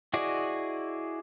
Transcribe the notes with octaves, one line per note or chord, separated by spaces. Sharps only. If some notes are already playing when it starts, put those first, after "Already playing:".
E4 F#4 G#4 D5 D#5